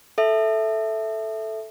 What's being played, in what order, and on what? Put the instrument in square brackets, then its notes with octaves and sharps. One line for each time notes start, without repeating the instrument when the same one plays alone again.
[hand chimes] A4 E5